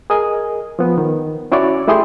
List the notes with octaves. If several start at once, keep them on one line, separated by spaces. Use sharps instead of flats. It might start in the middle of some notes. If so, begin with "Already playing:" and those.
G#4 A#4 D#5 G#5
F3 B3
D#3
C#4 E4 F#4 C#5 D5
A3 E4 G4 G#4 C6